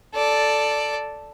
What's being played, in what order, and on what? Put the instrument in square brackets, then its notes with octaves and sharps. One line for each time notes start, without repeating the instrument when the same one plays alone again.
[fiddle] A4 D5